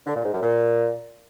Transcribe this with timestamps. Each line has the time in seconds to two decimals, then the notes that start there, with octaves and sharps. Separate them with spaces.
0.07 D3
0.16 A#2
0.25 G#2
0.34 F#2
0.43 A#2